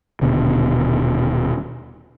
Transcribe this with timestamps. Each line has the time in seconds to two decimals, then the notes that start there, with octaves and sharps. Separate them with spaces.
0.22 D#1 B2 D3